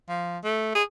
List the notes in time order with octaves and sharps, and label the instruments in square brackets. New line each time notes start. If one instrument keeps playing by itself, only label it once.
[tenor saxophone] F3
A3
G#4